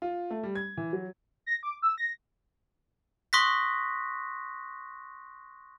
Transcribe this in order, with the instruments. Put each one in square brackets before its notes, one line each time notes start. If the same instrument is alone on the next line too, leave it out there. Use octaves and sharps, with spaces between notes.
[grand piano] F4
A3
G3
G#6
E3
F#3
[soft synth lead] A#6
D6
E6
A#6
[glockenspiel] C6 C#6 D#6 F#6 A#6 B6